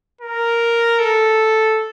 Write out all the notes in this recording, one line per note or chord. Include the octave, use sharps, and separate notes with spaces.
A#4
A4